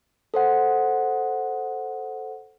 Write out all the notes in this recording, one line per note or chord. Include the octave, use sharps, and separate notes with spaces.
A4 C5 F#5